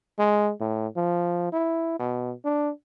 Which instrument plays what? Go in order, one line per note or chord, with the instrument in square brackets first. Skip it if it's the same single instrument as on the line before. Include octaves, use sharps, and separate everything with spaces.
[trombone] G#3
A2
F3
E4
B2
D4